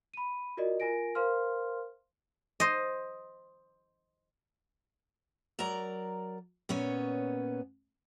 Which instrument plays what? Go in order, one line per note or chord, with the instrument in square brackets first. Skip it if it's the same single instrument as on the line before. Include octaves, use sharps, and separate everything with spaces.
[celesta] B5 D#7
F4 F#4 A#4 D5 D#5
F4 A#4 G#5 A#6 D7
A#4 C5 F5 C6 F6
[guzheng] C5 D#5
[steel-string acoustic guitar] F#3 A#4 D5 A#5
A#2 B3 C#4 C#5